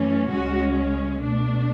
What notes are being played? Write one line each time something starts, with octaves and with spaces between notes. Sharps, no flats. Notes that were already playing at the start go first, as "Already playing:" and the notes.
Already playing: F#2 E3 A3 C#4
C#2 C#3 G#3 C#4 F#4
B2 A3 D4